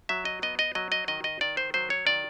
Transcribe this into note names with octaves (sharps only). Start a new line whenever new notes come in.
F#3 E5
D#5
B3 D#5
D#5
F#3 D#5
D#5
D#3 D#5
D#5
D#3 D5
C5
F#3 C5
C#5
D#3 D5